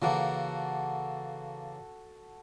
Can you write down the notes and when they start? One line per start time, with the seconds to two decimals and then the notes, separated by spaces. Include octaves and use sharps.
0.02 C#3 E3 A#3 F#4 A4 F#5